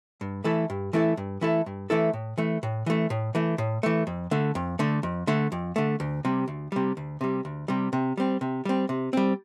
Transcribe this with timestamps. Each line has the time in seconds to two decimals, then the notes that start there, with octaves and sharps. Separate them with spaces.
0.21 G2
0.44 E3 A3 E4 A4
0.70 G2
0.93 E3 A3 E4 A4
1.17 G2
1.41 E3 A3 E4 A4
1.66 G2
1.90 E3 A3 E4 A4
2.13 A2
2.38 E3 A3
2.63 A2
2.86 E3 A3
3.10 A2
3.35 E3 A3
3.58 A2
3.83 E3 A3
4.07 F2
4.31 D3 A3
4.55 F2
4.79 D3 A3
5.03 F2
5.27 D3 A3
5.52 F2
5.76 D3 A3
6.00 D2
6.25 C3 G3
6.48 D2
6.72 C3 G3
6.97 D2
7.21 C3 G3
7.45 D2
7.68 C3 G3
7.93 C3
8.17 G3 C4
8.41 C3
8.65 G3 C4
8.89 C3
9.13 G3 C4